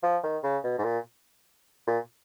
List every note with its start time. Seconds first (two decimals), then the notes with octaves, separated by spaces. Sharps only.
0.03 F3
0.23 D#3
0.44 C#3
0.64 B2
0.78 G#2
0.84 A#2
1.87 A#2